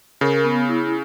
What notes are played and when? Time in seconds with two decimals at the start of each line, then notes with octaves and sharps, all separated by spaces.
0.21 C#3 A#4
0.44 B3
0.69 E4